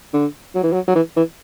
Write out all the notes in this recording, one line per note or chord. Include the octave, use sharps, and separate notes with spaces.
D3
F#3
E3
F#3
F#3
E3
E3